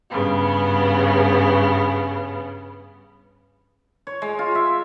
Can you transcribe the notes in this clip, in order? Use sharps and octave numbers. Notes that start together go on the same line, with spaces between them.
G2 C#3 B3
C#5
G#3
F4
E5